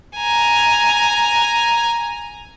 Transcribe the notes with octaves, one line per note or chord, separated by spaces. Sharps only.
G#5 A#5